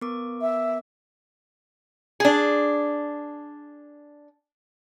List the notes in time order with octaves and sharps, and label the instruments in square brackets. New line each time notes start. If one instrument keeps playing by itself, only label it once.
[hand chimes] B3 A#4 D6
[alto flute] E5
[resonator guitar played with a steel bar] D4 G#4